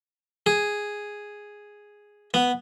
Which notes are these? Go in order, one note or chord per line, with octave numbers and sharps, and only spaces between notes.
G#4
B3